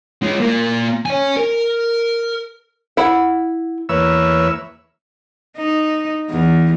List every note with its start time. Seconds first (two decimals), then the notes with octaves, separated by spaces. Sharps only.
0.22 G#3 F4
0.41 A#3 F4
1.06 C#5 G#5
1.36 A#4
2.97 E4 F#5
3.89 E2 A#3 B4 C#5 E5 E6
5.57 D#4
6.30 E2